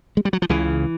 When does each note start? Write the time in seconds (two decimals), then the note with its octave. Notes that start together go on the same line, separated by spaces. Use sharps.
0.17 G#3
0.25 G3
0.33 F#3
0.42 F3
0.49 C#2 C#3 E3